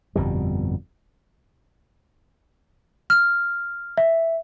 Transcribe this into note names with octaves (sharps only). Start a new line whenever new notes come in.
G1 F2 B2 G3
F6
E5